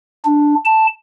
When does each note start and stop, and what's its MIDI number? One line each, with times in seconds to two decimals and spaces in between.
0.25 0.55 62
0.65 0.87 81